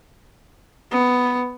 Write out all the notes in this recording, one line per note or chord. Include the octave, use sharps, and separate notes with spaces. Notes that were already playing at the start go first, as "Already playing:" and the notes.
B3